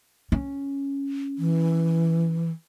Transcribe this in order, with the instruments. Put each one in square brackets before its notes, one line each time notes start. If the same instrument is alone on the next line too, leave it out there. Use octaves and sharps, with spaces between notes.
[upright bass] C#4
[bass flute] E3